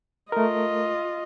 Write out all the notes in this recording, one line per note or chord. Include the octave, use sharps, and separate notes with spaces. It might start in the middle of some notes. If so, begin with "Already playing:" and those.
A3 F4 A#4 D#5